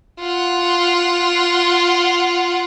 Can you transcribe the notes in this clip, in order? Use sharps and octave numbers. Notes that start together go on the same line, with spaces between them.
F4 F#5